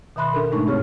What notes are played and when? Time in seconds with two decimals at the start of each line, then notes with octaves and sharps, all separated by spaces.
0.16 B2 D#3 E5 B5 C6 F#6
0.33 D4 A4 A#4
0.51 G#2 B2 G#3 A3 D#4 C#6
0.67 G2 C4 G#4 C#5 F6